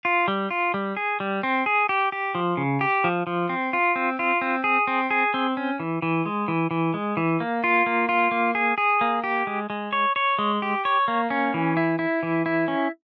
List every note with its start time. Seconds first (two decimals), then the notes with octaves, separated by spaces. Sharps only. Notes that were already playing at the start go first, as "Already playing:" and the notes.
0.05 F4
0.28 G3
0.51 F4
0.74 G3
0.97 G#4
1.20 G3
1.43 C4
1.66 G#4
1.89 G4
2.12 G4
2.35 F3
2.57 C#3
2.81 G4
3.04 F3
3.27 F3
3.49 C4
3.73 F4
3.96 C4
4.19 F4
4.41 C4
4.64 G#4
4.87 C4
5.11 G#4
5.34 C4
5.57 C#4
5.80 E3
6.02 E3
6.26 G#3
6.48 E3
6.71 E3
6.94 G#3
7.17 E3
7.40 A#3
7.64 F4
7.86 A#3
8.09 F4
8.31 A#3
8.55 G#4
8.78 G#4
9.01 A#3
9.24 G4
9.47 G#3
9.70 G#3
9.93 C#5
10.16 C#5
10.39 G#3
10.62 G4
10.85 C#5
11.08 A#3
11.30 C#4
11.54 E3
11.77 E4
11.99 E4
12.23 E3
12.46 E4
12.68 C#4